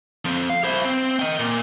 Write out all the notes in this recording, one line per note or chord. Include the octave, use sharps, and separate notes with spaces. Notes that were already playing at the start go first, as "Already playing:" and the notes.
F3 C4
F5
E4 C5
C4
D#5 G5
A#2